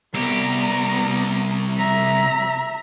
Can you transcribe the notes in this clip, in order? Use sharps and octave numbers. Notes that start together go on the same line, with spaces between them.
C2 B3 G4 A#5
E5 A#5